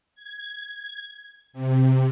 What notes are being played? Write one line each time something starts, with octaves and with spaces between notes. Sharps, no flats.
G#6
C3